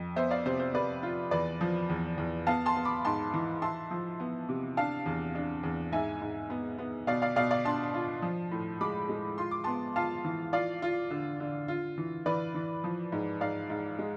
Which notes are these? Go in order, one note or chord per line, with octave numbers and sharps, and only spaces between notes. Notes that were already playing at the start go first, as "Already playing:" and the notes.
Already playing: F2
B3 C5 E5
D5 F5
C3 C5
C5
C3 B4 D5
F4
E2 B4 D5
F3
E2
E2
B3 F5 A5
A5 C6
B3
B5 D6
G#2 A5 C6
E3
E4 A5 C6
F3
B3
C3
D4 F5 A5
E2
D4
E2
G#2 E5 G#5
G#2
B3
B3
B2 D5 F5
D5 F5
B2 D5 F5
D5 F5
D4 A5 C6
F4
F3
A2
G#3 B5 D6
G#3
F4 C6
D6
B3 A5 C6
F4 F5 A5
E3
F4 D5 F5
F4
D3
D3
F4
E3
E3 B4 D5
E3
F3
G#2
G#2 D5 F5
G#2
G#3